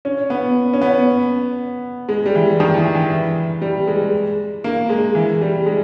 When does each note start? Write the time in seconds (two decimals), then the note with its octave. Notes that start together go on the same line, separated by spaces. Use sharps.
0.05 C#4
0.30 B3
0.73 C#4
0.82 B3
2.09 G#3
2.26 G3
2.35 E3
2.60 D#3
2.77 E3
2.95 E3
3.12 E3
3.62 G3
3.87 G#3
4.64 A#3
4.90 G#3
5.15 E3
5.41 G3
5.66 G#3